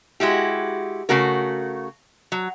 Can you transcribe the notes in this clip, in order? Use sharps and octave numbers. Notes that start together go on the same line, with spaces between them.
G#3 E4 F#4 G4
C#3 A3 F#4 A#4
F#3